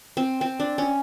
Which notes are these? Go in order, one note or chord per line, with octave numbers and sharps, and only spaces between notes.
C4
C4
D4
C#4